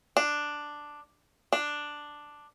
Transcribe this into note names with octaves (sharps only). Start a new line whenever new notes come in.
D4
D4